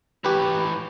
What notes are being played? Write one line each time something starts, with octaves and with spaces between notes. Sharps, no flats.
E3 G4 B4 C#5